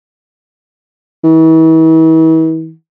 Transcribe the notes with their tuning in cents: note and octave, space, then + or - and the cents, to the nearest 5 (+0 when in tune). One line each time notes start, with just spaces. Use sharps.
E3 -40